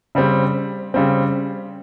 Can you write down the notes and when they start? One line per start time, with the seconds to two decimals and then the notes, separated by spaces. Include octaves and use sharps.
0.15 C#3 G3 C4
0.94 C#3 G3 C4